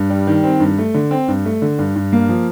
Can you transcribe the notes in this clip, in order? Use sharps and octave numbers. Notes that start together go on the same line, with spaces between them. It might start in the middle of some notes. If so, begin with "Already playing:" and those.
Already playing: G2
G3
D#3
C4
G2
A3
D3
C4
G2
A3
D3
G2
G2
A#3
F3